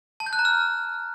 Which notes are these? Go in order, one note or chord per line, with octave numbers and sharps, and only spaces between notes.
A5
G6
F#6
A#5
F6